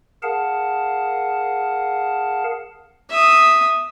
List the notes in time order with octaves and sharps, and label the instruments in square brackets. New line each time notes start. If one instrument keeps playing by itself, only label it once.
[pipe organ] G#4 A#4 F5 F#5 A5
[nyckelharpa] E5 D#6